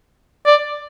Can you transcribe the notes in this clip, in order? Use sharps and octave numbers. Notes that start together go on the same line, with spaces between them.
D5